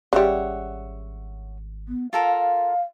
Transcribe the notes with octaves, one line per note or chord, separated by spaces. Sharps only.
G#1 C#3 G3 C#5 E5 F#5
B3
F4 A4 A#4 F5